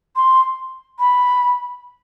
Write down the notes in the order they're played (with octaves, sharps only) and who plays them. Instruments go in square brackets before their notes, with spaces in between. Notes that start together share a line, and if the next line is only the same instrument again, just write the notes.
[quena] C6
B5